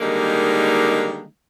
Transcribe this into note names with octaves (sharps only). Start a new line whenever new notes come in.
D3 D#3 G3 G#3 A#3 D#4